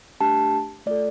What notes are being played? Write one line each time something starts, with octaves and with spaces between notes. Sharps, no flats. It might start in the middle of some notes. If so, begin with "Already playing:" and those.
A3 D4 G4 A5
A3 F4 A4 D5